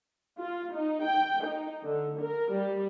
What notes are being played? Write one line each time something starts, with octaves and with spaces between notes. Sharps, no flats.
F4
D#4
G5
D#4
D3
A#4
G3